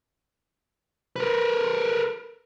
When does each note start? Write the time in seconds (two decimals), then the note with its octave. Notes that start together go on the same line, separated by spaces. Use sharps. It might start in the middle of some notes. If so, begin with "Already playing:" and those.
1.16 A#4 B4